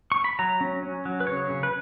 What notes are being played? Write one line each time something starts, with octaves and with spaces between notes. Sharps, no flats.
C#6
B5
F#3 A#5
C#4
C#4
F#3
B4
C#3 C#5
C#3
B4